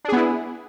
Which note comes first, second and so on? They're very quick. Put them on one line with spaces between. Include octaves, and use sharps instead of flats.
D4 G#4 B3 E4